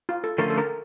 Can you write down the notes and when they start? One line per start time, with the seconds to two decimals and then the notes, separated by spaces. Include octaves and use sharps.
0.09 F4
0.24 A4
0.38 D3 F3 A3 C#4 F4 A#4
0.50 A4
0.58 A#4